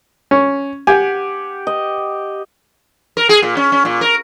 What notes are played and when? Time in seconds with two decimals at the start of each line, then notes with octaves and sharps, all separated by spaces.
0.31 C#4
0.87 G4 F#5 G#5
1.67 D#5
3.17 A#4
3.29 G#4
3.42 A#2
3.57 C#4
3.72 C#4
3.85 A#2
4.01 A#4